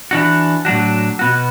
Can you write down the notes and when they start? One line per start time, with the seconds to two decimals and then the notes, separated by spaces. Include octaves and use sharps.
0.11 E3 D4 F#4
0.65 A2 F#3 D4 F#4
1.19 B2 B3 F#4